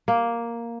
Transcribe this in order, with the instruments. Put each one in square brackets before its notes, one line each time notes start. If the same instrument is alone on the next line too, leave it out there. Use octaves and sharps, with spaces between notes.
[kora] A#3